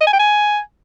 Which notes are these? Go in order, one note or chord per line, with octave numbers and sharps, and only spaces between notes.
D#5
G#5
G5
G#5